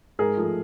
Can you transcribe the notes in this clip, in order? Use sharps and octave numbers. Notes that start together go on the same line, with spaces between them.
G#2 G#4 A#4
F3 A3